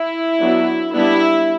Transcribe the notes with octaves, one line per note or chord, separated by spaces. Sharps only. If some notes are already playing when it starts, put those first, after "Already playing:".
Already playing: E4
F#3 B3 D4
G3 B3 D4 E4